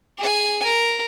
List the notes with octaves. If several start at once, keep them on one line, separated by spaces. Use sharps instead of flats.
G#4 G#5
A#4